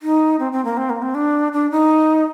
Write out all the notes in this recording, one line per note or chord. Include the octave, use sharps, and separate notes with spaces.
D#4
C4
C4
A#3
C4
A#3
C4
D4
D4
D#4